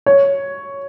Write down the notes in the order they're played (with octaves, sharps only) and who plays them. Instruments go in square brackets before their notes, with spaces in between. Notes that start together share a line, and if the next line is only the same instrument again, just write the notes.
[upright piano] C#5